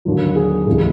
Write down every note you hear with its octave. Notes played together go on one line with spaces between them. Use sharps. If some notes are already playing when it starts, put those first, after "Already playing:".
D#2 D3 F#3
G#4
C#2 C3 E3 G#3